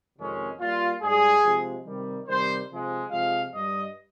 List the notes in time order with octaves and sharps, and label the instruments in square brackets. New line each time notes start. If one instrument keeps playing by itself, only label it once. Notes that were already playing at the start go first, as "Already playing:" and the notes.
[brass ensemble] F2 C3 D#3 G#3 C#4
A#2 G3 F4
G#2 G3 G#4
C3 F3 G#3
C3 D#3 G3
C3 D#3 G3 C5
C3 F3 G#3
C3 F3 G#3 F5
G2 G3 D#5